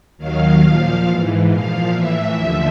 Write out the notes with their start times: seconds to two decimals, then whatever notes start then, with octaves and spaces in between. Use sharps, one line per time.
0.18 D#2 D#3 F#3 F5
0.62 A#2 F3
1.06 G#2 E3
1.50 A#2 F3 F5
1.93 A2 E3 E5
2.38 D#2 D3 F3